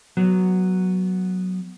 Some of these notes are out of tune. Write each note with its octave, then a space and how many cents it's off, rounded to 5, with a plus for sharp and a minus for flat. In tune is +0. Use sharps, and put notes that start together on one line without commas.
F#3 +0 B3 -5